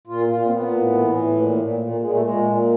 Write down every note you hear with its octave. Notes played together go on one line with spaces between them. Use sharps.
A#2 F4
A#2 F4
C4
A#2 B3
A2
E3
A2
A#2
A#2
A#2
A#2 G#3
A3
A#2 G#3
A#2